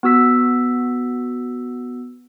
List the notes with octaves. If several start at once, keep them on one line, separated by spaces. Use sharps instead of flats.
B3 F#4 E6 B6